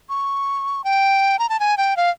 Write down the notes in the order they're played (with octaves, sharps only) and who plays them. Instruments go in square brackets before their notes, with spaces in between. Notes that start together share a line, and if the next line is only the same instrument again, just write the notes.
[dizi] C#6
G5
A#5
A5
G#5
G5
F5